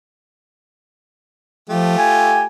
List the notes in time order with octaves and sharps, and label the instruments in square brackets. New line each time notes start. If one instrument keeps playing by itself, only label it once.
[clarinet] F3 [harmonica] A3 F4 G4
[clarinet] G#5